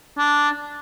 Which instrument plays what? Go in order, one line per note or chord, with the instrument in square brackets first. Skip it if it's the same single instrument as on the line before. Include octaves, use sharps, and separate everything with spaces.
[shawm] D4